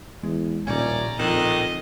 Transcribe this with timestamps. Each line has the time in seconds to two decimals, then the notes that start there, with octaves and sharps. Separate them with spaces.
0.23 E2 G#3
0.67 D#1 A#1 A2 C#3 C#4 D5 A#5
1.19 F2 D#3 D#5